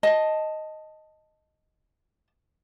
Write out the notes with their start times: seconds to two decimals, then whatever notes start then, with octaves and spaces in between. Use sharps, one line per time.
0.03 D#5 A5